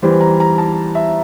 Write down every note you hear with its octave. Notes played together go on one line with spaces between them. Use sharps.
E2 E3 G3 C5
A#5
A#5
A5
E5